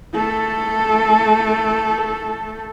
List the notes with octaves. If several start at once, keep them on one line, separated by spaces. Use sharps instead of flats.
A3 A4